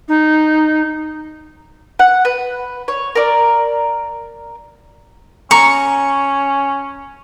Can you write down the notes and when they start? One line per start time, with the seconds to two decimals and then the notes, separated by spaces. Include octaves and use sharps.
0.08 D#4
1.99 F#5
2.25 B4
2.88 C#5
3.15 A#4 D5
5.51 C#4 A#5 C#6